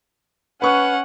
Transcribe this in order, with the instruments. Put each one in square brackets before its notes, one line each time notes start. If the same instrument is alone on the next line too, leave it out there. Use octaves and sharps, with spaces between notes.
[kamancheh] C#4 F#5 [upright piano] B4 C#6